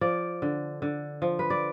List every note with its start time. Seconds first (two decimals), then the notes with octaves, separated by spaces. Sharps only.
0.01 F3 D5
0.42 D3
0.82 D3
1.22 F3
1.39 B4
1.50 D5